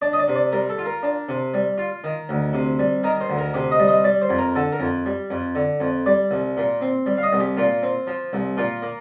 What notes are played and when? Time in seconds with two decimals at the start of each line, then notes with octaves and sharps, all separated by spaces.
0.02 D4 D5
0.13 D#5
0.19 D5
0.28 C3
0.36 D5
0.52 G3 A#4
0.69 A4
0.78 F4
0.86 A#4
1.03 D4
1.29 C3
1.54 G3
1.78 F4
2.04 D#3
2.29 D2
2.53 C3
2.79 G3
3.04 D#3 A#4
3.21 C5
3.30 D2
3.38 A#4
3.54 C3 G4
3.71 D#5
3.79 G3
3.88 D#5
4.04 G3 D5
4.22 C5
4.29 F2
4.38 A#4
4.55 D3 A4
4.72 A#4
4.80 F2
5.06 G3
5.31 F2
5.55 D3
5.80 F2
6.06 G3 D5
6.31 C2
6.57 A#2
6.81 C4
7.06 G3
7.17 F5
7.23 D#5
7.33 C2
7.40 G4
7.57 A#2 F4
7.83 C4
8.07 F3
8.33 C2
8.57 A#2 F4
8.82 A#3